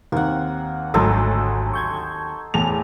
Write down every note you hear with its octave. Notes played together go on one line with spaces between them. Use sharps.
D#2 A#3 C4 F#5
G#1 D2 G#2 F#3 D#4 A4 C5
C#6 G6 G#6
E2 A2 A5 F7